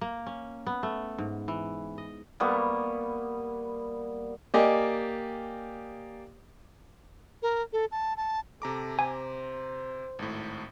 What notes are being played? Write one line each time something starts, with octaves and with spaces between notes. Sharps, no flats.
A#3
C#4
B3
A3
G#2
E3
D#5
G3 A#3 B3 C#6
A#3 G4 D5 D#5 G#5
A#4
A4
A5
A5
C3 A4 A#5 D6
C5 G#5
G#1 A2